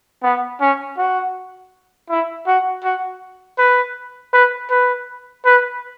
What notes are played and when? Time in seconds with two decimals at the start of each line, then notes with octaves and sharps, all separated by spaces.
0.22 B3
0.61 C#4
0.97 F#4
2.10 E4
2.47 F#4
2.84 F#4
3.58 B4
4.33 B4
4.70 B4
5.45 B4